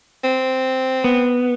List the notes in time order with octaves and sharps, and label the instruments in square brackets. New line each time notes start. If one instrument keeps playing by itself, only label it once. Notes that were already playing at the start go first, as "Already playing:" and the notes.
[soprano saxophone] C4
[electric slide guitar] B3